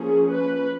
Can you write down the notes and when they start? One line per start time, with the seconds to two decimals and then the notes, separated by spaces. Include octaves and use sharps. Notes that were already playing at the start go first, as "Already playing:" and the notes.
Already playing: F3 A#3 C#4 G#4
0.33 B4